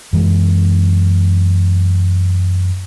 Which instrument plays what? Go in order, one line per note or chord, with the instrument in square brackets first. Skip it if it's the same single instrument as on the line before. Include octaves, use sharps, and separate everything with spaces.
[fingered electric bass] F#2 E3 G#3